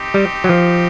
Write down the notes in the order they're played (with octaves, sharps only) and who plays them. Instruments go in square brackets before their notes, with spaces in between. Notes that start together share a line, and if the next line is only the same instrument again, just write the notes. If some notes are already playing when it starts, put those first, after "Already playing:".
Already playing: [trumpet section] C4 D#4 G4
[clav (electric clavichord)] G3
F#3
F3